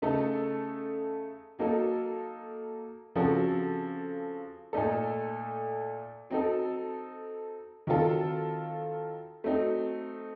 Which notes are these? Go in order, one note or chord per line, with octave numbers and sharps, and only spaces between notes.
C#3 A3 D#4 A4
F#3 A#3 D#4 A4
C#3 F3 C4 F#4 A4
A#2 A3 D#4 A4
F#3 C4 D#4 A4
D#3 F#3 C4 F4 A4
F#3 A3 C4 D#4